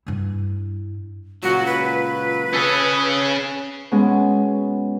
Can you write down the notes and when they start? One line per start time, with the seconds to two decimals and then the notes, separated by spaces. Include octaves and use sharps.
0.07 G2 E4
1.43 C#2 A#2 F#3 F#4
1.66 B4
2.54 C#4 G#4 A4
3.91 B2 G#3 C#4